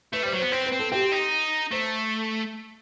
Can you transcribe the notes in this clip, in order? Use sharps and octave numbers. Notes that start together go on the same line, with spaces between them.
A3 B4
G3 C5
F#3
C5
B3
C4 C5
B4
C4
A4
C4 G4
D#4
A3 C5